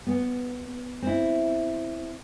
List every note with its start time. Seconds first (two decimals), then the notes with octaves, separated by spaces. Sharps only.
0.07 B3
1.02 C4 E4